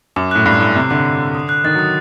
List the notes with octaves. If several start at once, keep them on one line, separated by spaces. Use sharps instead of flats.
F#2 D6
A2 F#6
G2 C7
A2 D6
C3 D6
D3 F#6
C7
D6
D#6
F#6
D#3 A6
F#3 D#6